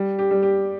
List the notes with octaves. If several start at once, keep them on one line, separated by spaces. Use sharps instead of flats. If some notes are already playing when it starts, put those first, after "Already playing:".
Already playing: G3
G4
G3
G4